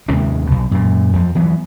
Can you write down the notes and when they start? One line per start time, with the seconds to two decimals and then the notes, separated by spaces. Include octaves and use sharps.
0.08 D#2 C3 G#3 C#4
0.47 B1 B2
0.71 F#2 A#2
1.13 F2 F3
1.35 E3 F#3 B3